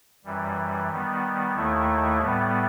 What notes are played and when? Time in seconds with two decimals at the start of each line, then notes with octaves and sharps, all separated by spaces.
0.24 F#2 E3 G3
0.91 D#3 G3 B3
1.55 D#2 D#3 A3 E4
2.20 A2 G3 B3